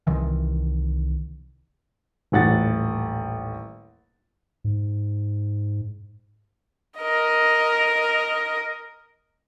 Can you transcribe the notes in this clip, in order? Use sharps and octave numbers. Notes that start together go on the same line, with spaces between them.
C2 C3 D#3 E3
D#1 A1 F#5 A6
G#2
A#4 D#5